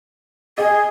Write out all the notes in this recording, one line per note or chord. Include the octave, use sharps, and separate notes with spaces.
G#4 D#5